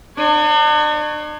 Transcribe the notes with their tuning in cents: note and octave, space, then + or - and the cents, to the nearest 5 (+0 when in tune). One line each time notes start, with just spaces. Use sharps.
D4 +45 C#5 +0